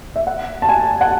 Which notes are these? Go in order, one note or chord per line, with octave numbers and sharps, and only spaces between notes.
E5
F#5
A5
G#5
F#5